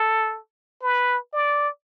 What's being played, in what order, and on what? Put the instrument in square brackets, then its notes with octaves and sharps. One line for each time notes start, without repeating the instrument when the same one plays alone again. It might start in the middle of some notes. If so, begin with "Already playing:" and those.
Already playing: [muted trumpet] A4
B4
D5